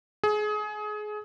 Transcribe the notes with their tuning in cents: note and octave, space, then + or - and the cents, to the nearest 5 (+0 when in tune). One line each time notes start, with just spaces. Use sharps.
G#4 +25